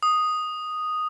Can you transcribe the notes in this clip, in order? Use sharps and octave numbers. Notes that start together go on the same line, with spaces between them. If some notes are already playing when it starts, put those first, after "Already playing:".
D#6